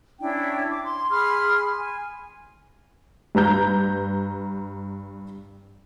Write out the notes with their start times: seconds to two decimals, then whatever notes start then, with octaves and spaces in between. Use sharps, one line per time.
0.20 C#4 D4 E4 G5
0.68 D6
0.84 C6
1.10 G#4 B5 C6 F6
1.76 G#5
3.35 G2 B4 A#5 G6